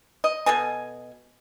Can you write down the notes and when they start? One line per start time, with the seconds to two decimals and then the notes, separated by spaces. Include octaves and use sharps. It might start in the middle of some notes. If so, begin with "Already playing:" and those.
0.24 D#5
0.46 B2 A4 D#5 G#5